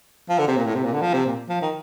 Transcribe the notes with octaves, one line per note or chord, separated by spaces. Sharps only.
F3
D3
C3
A#2
A2
C3
A#2
D3
F3
C3
A#2
F3
D#3